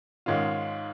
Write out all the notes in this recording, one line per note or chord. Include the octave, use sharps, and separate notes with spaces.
G#2 D#3 G#3 C#4 F4